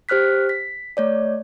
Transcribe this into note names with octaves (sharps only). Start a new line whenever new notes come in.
G4 C5 F6 F#6 B6
B6
A3 C#5 D5